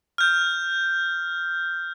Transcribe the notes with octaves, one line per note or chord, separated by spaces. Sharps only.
F6 G6